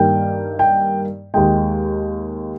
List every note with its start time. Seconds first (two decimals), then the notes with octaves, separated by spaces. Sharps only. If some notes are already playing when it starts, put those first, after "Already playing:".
Already playing: G2 D#3 G3 A#3 G5
0.59 G5
1.34 D#2 D#3 G#3 G5